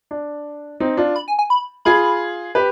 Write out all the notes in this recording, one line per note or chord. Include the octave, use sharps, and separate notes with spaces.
D4
C4 D#4
D4 F4
B5
G#5
G#5
B5
F4 G#4 B5
G4 B4